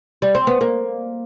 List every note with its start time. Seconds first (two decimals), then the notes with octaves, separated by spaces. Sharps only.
0.22 G3
0.35 C4
0.47 B3
0.61 A#3